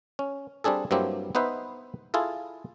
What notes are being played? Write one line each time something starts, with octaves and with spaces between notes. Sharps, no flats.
C#4
G3 C4 D4 G#4 A4
G2 F#3 A#3 C4 E4 G4
B3 D#4 B4 C5 E5
E4 F4 G#4 A4